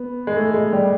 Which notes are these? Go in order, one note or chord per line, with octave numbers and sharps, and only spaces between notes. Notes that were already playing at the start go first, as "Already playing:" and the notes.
Already playing: B3
G#3
A3
G#3
G3